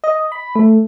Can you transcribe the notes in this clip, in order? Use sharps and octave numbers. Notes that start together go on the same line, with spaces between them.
D#5
B5
A3